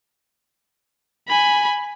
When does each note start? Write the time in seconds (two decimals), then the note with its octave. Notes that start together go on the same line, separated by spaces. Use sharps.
1.28 G#5 B5